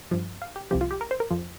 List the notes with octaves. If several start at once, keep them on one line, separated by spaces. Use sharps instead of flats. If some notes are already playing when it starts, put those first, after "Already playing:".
G2 F3
F5
G4
C2 C3 F3 G4
F4
G4
A#4
C5
A#4
F2 F3